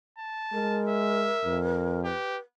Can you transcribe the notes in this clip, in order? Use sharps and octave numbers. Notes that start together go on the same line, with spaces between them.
A5
G#3 A#4
E5
F2
G4 B4